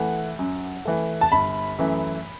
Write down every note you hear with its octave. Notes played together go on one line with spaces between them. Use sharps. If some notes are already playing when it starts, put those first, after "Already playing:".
Already playing: E3 A3 F#5
F#2
E3 A3
A5
G1 B5
F#2 E3 A3